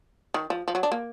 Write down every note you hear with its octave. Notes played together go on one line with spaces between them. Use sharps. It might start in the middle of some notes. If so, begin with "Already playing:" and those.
D#3
F3
F3
F#3
D4
A#3